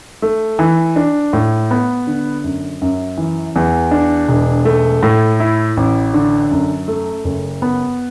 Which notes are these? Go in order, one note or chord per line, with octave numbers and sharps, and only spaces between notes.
A3
E3
D4
A2
B3
D3
F#2
F#2
E3
E2
D4
E1
A3
A2
E4
A1
D3
F#2
A3
F#1
B3